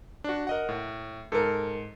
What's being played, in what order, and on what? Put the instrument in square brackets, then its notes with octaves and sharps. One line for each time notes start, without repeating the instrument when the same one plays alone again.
[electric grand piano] D4 F#4
A#4 D#5 F#5
A2
[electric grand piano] G#2 [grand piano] A4 A#4